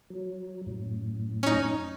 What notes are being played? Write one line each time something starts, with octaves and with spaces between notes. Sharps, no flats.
F#3
F#2 A2
C#4 D#4